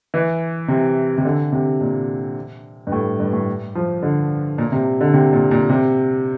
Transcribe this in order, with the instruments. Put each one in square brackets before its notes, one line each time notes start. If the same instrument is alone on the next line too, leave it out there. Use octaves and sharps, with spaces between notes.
[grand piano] E3
C3
C3
D3
C3
A#2
G2
A2
G2
A2
F3
D3
A#2
C3
D3
C3
A#2
A#2
C3